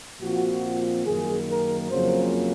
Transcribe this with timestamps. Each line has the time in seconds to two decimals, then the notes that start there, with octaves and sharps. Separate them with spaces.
0.22 A#2 F3 C4 F#4
1.06 F#2 D#3 A#3 G#4
1.49 A#4
1.91 F2 C#3 F#3 A#3 C5